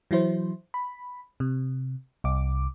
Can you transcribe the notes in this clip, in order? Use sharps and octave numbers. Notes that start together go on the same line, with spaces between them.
E3 F#3 E4 C5
B5
C3
C2 D6